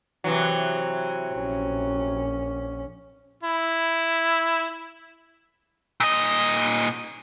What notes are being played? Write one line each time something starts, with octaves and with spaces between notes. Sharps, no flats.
C3 E3 F#3
A#1 C#4
E4
A#2 D#5